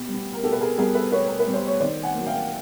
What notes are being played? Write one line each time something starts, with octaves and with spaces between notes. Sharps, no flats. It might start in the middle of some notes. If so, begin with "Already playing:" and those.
Already playing: B2 B3 G4
G3
B3
A#4
B2 G4 A4
B4
G#4 A#4
G3 B3 G#4 A#4
A4 B4
B2 B4 C#5
A#4
B4
G3 B3
C5
C#5
D#3 C5 D5
F#5 G#5
F#3 A#3
F5 G5